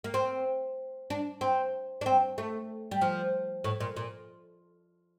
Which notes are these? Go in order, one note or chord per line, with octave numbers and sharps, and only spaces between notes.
A#3
C4
D4
C4
D4
C4
A3
G3
F3
A2
A#2
A#2